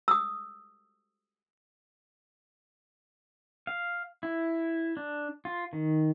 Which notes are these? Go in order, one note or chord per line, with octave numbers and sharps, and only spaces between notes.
D#6 E6
F5
E4
D4
F4
D#3